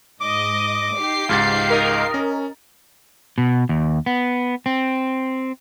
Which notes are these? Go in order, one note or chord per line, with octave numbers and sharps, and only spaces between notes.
G#2 D#5 D6
D#4 G4 C7
C#2 G#2 F5 A6
A#4 D#5
C#4
B2
D#2
B3
C4